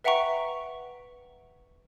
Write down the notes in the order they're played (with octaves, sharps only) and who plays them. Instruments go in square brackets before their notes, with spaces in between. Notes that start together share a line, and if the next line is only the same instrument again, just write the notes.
[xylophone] B4 E5 F#5 G5 A#5 C#6